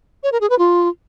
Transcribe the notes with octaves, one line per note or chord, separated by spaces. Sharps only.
C#5
A#4
G#4
B4
F4